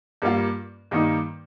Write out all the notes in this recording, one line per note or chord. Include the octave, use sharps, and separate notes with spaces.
G2 G3 A#3 F4
G2 D#3 A#3 D#4